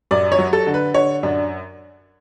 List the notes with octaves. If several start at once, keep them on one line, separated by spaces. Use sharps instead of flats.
F#2 D5
C#5
F#3
A4
D3
B4
D3 C#5
F#2 D4